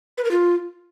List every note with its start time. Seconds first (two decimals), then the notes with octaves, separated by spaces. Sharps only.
0.18 B4
0.24 A#4
0.31 F4